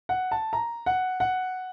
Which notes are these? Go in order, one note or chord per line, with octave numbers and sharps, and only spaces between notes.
F#5
A5
A#5
F#5
F#5